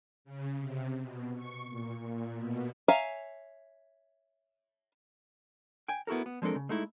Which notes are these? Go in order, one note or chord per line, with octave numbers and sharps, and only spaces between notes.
C#3
C3
B2
C#6
A#2
A#2
B2
C#5 E5 F5 G#5 A#5
G5 G#5
B3 E4 F#4 A4 A#4
B3
F3 G#3 C4 D4 A4 A#4
C#3
G#3 A3 D#4 E4